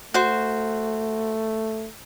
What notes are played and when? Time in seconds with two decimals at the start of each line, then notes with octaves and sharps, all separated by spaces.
0.14 A3 F#4 C5